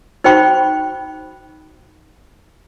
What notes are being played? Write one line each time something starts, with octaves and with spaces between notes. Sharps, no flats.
D#4 F#4 C5 G5 B5 C#6